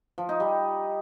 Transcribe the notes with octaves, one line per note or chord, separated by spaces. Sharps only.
F3
D#4
G3